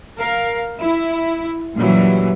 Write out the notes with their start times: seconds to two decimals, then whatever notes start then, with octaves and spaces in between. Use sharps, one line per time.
0.19 A#4 F5
0.81 E4
1.74 F#2 A#2 E3 F#3 G3